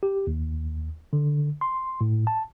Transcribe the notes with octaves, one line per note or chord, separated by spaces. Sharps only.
G4
D#2
D3
C6
A2
A5